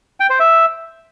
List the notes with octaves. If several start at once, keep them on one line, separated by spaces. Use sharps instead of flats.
G5
C5
E5